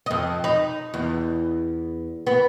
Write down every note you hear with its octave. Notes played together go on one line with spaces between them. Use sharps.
F2 D#5
D#4
E2
B3